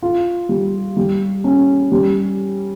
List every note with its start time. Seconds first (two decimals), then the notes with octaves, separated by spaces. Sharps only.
0.02 F4
0.49 G3
0.97 G3
1.44 C#4
1.92 G3